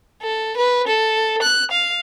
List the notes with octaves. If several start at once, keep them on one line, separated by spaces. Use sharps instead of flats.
A4
B4
A4
F#6
F5